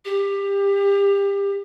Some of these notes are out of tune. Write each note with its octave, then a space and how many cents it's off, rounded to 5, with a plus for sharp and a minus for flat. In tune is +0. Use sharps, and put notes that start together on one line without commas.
G4 +25